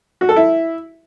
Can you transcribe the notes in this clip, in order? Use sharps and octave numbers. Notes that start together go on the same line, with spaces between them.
F#4
A4
E4